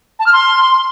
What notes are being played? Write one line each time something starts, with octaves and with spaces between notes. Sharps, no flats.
A5
F6
C6